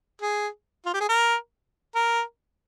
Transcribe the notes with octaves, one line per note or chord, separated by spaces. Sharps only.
G#4
F4
G4
G#4
A#4
A#4